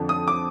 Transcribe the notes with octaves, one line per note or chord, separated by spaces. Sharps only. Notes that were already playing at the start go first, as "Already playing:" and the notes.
Already playing: F2 D3 F3
D#6
D6